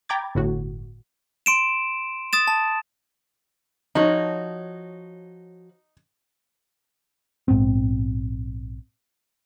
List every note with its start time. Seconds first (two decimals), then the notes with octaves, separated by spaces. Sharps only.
0.09 G5 A#5 B5 D6 G#6 A6
0.35 G1 A2 F#4
1.46 C6 D7 E7
2.33 D#6 A6 E7
2.47 A5
3.95 F3 D#4 F#4 C#5
7.48 A#1 G#2 B3 C4